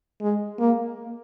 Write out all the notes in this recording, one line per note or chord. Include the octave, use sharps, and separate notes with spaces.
G#3
A#3